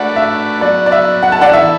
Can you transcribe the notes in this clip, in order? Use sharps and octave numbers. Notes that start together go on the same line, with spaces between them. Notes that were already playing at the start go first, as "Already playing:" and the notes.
Already playing: A3 D4 F#4 B4 D5 F#5
E5
F#3 B3 F#4 D5
D5
E5
F#5
A5
D5 F#5
E3 B3 E4 A4 E5